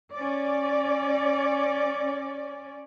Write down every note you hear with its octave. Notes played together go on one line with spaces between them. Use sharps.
C#4 D5